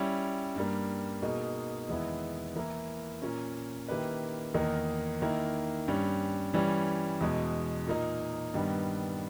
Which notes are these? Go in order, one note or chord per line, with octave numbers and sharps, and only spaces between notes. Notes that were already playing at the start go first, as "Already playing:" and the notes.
Already playing: G3 C#4 E4
G2 G3 A#3
B2 A#3 D#4 G#4
E2 D#3 G#3 B3 E4
E3 A#3 E4 A#4
A#2 A#3 C#4
D#3 A#3 E4 G4 B4
E2 D#3 A#3 D#4 A#4
D#3 A#3 E4
G2 G3 C#4
E3 G3 C#4
E2 B2 G#3
A#2 A#3 D#4
G2 D#3 G3 B3